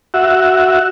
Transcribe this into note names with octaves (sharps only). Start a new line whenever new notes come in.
F#4 E5